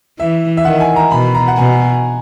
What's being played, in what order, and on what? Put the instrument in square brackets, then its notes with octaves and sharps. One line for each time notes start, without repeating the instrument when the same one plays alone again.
[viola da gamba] E3 [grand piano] E5
[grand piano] E5
[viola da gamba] D#3 [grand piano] F#5
[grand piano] G#5
A#5
[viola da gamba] B2 [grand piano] B5
[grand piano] A#5
F#5
[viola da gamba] B2 [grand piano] G#5
[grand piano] G#5